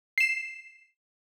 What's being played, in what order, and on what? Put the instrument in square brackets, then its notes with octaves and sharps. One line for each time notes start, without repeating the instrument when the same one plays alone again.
[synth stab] C7 E7